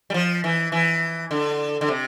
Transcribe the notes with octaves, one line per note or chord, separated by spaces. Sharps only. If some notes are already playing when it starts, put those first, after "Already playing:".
G3
F3
E3
E3
D3
D3
C3